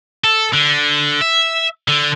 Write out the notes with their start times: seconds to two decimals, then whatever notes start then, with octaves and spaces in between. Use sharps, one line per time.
0.24 A4
0.54 D3
1.21 E5
1.88 D3